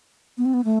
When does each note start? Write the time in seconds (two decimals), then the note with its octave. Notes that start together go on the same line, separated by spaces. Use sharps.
0.38 B3
0.45 C4
0.54 B3
0.65 A3